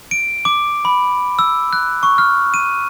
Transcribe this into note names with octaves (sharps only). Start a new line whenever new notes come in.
D7
D6
B5
E6
F#6
C#6
F6
D#7